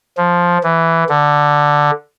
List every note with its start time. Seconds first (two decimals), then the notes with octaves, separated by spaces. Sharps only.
0.17 F3
0.63 E3
1.09 D3